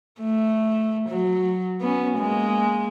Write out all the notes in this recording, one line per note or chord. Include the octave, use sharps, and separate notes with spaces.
A3
F#3
B3 C#4
G#3 A#3